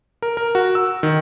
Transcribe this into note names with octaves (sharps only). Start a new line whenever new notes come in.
A#4
A#4
F#4
E6
D#3